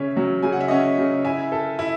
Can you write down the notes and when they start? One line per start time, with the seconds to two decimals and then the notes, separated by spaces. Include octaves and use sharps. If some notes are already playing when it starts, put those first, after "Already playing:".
Already playing: C#3 C#4 C#5 E5
0.17 F#3
0.43 C#3 G#5
0.52 F#5
0.60 E5
0.68 C#4 D#5 F#5
0.98 C#3
1.25 E4 E5 G#5
1.52 A4
1.79 E4